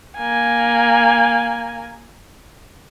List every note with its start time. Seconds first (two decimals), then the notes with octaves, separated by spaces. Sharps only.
0.18 A#3 G#5